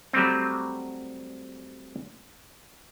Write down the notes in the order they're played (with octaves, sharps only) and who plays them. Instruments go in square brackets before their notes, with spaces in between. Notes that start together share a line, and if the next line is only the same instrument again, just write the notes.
[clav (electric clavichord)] F#3 G3 A3 C4